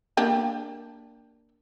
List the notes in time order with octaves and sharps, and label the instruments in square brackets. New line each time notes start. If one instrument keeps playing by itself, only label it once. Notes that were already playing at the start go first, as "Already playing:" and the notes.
[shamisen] A#3 D4 G4